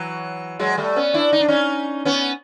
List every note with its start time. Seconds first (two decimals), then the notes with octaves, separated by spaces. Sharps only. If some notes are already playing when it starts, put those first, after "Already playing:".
Already playing: E3 F#3
0.59 F#3 G#3
0.77 G3 A3
0.96 B3 C#4
1.14 D4 E4
1.33 D#4
1.40 D4
1.48 C#4 D#4
2.05 B3 C#4